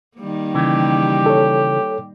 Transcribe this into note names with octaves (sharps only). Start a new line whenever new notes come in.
D#3 G3 A#3
C#3 E3 G4
A4 C#5